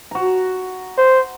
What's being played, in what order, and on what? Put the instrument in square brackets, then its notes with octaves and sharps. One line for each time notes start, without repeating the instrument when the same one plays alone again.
[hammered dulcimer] F#4 A#5
[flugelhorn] C5